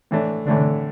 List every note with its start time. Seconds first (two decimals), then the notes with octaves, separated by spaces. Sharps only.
0.11 A2 E3 A3 D4
0.46 A2 D3 E3 A3 D4